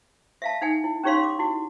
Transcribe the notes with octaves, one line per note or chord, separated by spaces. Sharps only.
E5 F5 A5
D#4 F#5 G#5
E4
C#4 D#4 G4 C#5 F5 C6
D6
E4 F#4